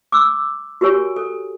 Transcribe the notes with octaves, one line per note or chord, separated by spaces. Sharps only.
D6 E6
F#4 G4 A#4 C#5 G#5
A4